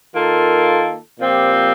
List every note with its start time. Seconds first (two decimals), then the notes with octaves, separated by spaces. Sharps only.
0.15 D#3 A#3 F4 A4
1.19 A#2 F3 C4 G4